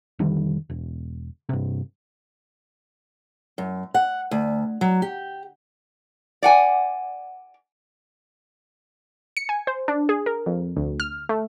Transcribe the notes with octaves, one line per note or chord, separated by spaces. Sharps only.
F1 D3 D#3 G3
E1
G2 C3
F#2
F#5
D2
F#3
G4
D5 F#5 G#5
C#7
G#5
C5
D4
G#4
A#4
F2
D2
F6
A3